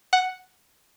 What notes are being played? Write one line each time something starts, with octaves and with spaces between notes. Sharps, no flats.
F#5